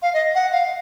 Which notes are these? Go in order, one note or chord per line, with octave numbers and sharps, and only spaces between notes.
F5
D#5
F#5
F5